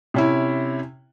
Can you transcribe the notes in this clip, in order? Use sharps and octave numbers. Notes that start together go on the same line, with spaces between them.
C3 C#4 E4